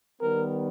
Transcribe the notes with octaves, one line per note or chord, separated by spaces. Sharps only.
D#3 G3 B3 A#4